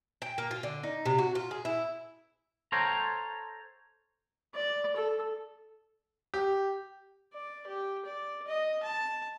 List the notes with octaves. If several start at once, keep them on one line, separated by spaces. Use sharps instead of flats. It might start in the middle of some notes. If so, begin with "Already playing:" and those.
G5
A#3
F4
D3
D#4
C3
F#4
F4
G#4
E4
A4 C5 C#5 F5 G5 A#5
D5
A4
G4
D5
G4
D5
D#5
A5